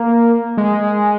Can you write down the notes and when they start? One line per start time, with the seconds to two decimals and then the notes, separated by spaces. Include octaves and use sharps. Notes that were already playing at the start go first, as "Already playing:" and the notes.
Already playing: A#3
0.57 G#3